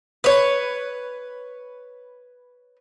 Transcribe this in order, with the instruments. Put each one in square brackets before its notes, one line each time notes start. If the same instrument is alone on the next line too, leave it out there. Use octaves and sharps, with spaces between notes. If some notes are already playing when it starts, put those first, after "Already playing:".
[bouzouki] B4 C#5